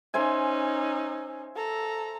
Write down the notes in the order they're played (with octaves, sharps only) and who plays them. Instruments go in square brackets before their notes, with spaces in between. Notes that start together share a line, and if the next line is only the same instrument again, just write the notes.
[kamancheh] C#4 D#4 [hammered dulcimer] C5 E5 G#5
[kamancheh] A4 A#5